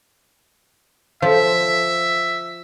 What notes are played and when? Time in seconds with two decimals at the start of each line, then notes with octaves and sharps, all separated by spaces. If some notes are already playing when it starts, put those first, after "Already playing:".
1.22 F3 E5